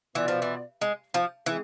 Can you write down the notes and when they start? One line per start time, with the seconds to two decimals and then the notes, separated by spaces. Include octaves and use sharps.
0.15 B2 E3 B3 F4 B4 D5
0.28 F3
0.42 E3
0.81 G#3
1.14 F3
1.46 E3 G#3 C4 G#4